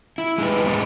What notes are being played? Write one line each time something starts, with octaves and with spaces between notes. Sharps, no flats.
E4
G#3 D#4 B4
G#3 B3 D#4